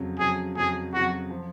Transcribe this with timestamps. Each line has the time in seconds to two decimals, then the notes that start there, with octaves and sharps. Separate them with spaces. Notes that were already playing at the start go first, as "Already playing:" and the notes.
Already playing: F2 C#3 F#3
0.19 F2 C#3 F#3 G#4
0.57 F2 C#3 F#3 G#4
0.93 F2 C#3 F#3 F#4
1.30 F3